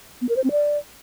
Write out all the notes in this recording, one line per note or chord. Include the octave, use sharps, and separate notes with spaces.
B3
A#4
C5
C4
D5